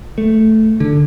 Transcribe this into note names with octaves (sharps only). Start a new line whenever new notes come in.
A3
D3